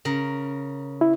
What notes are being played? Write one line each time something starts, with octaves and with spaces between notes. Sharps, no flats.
C#3 A#4
E4